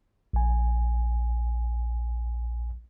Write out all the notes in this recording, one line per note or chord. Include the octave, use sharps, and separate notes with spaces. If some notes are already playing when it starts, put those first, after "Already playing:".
A#1 G#5